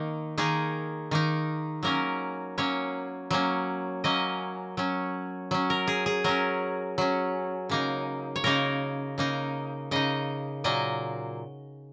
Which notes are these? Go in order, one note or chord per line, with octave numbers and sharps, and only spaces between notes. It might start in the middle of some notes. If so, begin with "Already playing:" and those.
Already playing: D#3 A#3 D#4
D#3 A#3 D#4 G#4
D#3 A#3 D#4
F#3 A#3 C#4 A#4
F#3 A#3 C#4 C#5
F#3 A#3 C#4
F#3 A#3 C#4 D#5
F#3 C#4
F#3 C#4
A#4
G#4
G#4
F#3 C#4 A#4
F#3 C#4
C#3 A#3 D#4
C#5
C#3 A#3 D#4 A#4
C#3 A#3 D#4
C#3 A#3 D#4 D#5
A#2 F#3 A#3 D#5